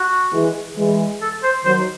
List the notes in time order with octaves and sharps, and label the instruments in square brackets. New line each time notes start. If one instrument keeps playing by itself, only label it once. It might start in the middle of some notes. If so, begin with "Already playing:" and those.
Already playing: [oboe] F#4
[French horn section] E3 G#3
E3 G#3
[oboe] A4
C5
[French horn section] D#3 F#3 [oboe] C5